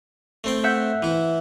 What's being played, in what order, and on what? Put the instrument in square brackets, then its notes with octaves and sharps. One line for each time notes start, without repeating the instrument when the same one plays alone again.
[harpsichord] A3 C4 G5
[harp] E5 F#5 G6
[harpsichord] E3 E4